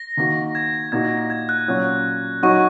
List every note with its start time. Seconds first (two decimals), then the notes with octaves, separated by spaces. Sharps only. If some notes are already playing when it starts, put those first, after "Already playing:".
Already playing: A#6
0.17 D#3 A#3 F#4
0.55 G#6
0.92 A#2 A#3 D#4 F#4 G#6
1.05 G#6
1.18 A#6
1.30 G#6
1.49 F#6
1.68 A#2 F#3 C#4 F#4
2.43 F#3 D#4 F#4 C#6